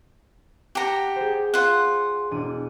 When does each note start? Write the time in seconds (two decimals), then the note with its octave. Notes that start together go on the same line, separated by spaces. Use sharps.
0.75 G4 F#5 A5 A#5 E7
1.16 G#4 C5
1.54 F4 F#5
2.31 E1 D4 D#7